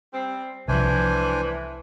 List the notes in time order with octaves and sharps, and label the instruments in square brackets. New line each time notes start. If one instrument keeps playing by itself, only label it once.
[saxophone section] G3 C4
[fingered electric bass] C2 F3 [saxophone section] A2 E3 [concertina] D4 C5 G#5